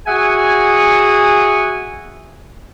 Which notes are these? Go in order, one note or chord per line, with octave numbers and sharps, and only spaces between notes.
F#4 G#4 E5 F#5 G#5